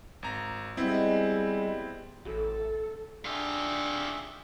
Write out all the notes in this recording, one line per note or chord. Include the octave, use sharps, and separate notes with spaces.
G#1 A#5
G3 G#3 B3 C4 E4
A1 A4
D4 F4 G4 G#4 E5